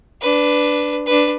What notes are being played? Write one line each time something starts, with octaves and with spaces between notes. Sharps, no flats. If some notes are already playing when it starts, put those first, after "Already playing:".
D4 B4
D4 B4